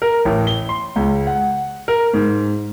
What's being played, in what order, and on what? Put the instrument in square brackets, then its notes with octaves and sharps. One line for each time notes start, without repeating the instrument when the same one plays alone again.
[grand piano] A#4
A1
G7
C6
C#2
F#5
A#4
G#2